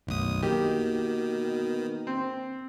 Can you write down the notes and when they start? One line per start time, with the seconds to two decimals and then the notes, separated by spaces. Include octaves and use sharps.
0.07 B1 F#2 D#3 A3 D#6
0.43 B2 D#3 A#3 G4
2.07 C4